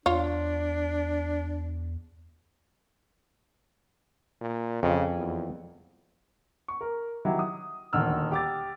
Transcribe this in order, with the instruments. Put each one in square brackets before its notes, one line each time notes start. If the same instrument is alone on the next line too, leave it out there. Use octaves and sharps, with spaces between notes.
[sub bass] E2 [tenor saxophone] D4 [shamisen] F4 C#5
[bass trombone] A#2
[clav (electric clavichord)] F2 [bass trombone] C#3
[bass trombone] E2
[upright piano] C#6
A#4
D#3 F#3 E4 G4
D#6
D#1 D2 D#3 E6 F6
G4 D6 A6